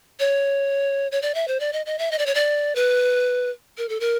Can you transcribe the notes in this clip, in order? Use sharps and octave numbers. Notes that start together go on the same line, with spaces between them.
C#5
C#5
D5
E5
C5
D5
D#5
D#5
E5
D#5
D5
C#5
D5
B4
A#4
A4
A#4